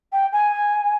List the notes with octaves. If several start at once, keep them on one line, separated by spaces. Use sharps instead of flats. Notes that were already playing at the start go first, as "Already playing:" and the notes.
G5
G#5